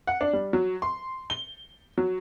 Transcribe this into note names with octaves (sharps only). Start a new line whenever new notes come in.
F#5
D4
G3
F#3
C6
G7
F#3